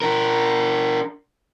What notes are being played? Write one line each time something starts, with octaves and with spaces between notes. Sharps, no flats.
D4 A#4